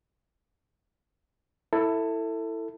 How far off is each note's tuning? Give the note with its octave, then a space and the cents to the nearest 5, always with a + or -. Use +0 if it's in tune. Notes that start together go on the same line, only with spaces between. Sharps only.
E4 +0 A4 +20